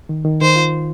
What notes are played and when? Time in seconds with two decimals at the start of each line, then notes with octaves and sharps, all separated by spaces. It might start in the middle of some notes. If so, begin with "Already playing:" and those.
0.09 D#3
0.25 D#3
0.41 D#3 C5
0.56 F4